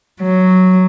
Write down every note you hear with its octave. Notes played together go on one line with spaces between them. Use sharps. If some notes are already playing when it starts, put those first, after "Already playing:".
F#3